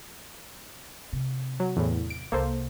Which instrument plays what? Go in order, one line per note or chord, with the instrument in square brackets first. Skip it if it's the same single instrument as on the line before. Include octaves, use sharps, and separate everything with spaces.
[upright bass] C3
[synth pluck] F#3
E2 A2
D7
[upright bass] C2 [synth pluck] A#3 A4 C5